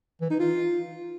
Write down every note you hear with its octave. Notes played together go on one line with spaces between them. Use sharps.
E3
D#4
F4